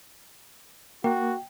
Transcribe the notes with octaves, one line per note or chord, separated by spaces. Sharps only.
A#3 F#4 G5